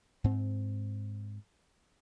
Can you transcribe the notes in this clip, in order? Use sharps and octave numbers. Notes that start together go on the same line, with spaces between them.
G#2 C4